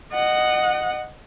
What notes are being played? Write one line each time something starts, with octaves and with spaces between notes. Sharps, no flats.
D#5 F#5